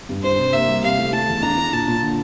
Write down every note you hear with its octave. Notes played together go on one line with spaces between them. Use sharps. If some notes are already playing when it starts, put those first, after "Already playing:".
G2
D4 C5
C3
A#3 E5
G3
C3 F5
A3
A3 A5
E2
D4 A#5
D4
A#2 A5
A#2
D3